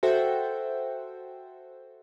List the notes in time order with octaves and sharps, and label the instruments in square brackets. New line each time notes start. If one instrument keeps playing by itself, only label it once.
[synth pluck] F#4 A4 C5 E5 F#5 G5